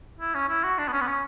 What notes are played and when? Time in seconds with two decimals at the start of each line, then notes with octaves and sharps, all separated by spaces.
0.20 E4
0.35 C#4
0.49 E4
0.64 F#4
0.79 D4
0.88 B3
0.93 C#4
1.01 B3
1.07 C#4